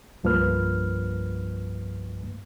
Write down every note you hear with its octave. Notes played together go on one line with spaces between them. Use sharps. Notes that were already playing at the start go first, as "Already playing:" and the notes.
C2 G2 F3 A#3 B4 F6